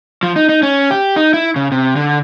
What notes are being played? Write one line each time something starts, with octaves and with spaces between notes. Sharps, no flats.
F3
D#4
D#4
C#4
G4
D#4
E4
C#3
C3
D3